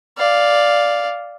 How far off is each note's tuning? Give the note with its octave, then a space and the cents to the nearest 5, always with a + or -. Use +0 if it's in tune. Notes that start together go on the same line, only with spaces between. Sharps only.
D5 +0 F5 +0